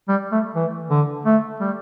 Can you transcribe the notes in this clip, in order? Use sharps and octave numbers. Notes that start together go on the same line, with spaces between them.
G3
A3
E3
D3
A3
G3